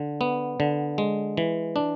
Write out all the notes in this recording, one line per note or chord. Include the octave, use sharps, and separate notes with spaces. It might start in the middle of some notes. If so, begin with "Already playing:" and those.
Already playing: D3
B3
D3
G#3
E3
D4